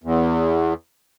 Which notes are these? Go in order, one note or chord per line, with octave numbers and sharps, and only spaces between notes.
E2